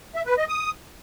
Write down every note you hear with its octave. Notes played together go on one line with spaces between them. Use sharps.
E5
B4
D#5
D#6